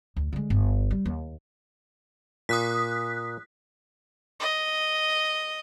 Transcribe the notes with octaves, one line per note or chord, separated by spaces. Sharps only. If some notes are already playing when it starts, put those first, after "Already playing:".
D2
D3 G#3
G1
G3
D#2
A#2 D#6 F#6 B6
D#5